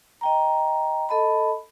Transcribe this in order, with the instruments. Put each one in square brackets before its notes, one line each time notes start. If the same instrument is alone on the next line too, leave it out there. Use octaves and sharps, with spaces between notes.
[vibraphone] D#5 G5 A#5
A4 D#5 A5 B5